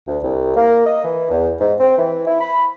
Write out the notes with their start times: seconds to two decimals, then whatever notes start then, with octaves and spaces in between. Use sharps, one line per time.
0.08 D2
0.23 C2
0.56 A#3
0.86 D#5
1.05 E3
1.31 E2
1.60 G#2
1.80 C4
1.98 E3
2.27 E4
2.41 B5